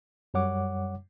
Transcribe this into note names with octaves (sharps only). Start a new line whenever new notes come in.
F#2 G3 C#5 F#5 D6